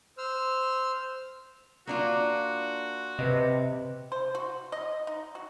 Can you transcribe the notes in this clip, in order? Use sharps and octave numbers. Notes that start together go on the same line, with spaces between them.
C5 E6 F6
A#3 D4 F4 F#4
C3 B4 D#5
C5
F#4
D#5
D#4
F#4